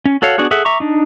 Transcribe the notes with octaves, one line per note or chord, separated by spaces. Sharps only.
C#4
F#4 A4 C#5 F5 F#5
B3 D4 F#4 G#4 F#5
G#4 A4 E5 F#5
E5 A#5 C#6 D6
D4 D#4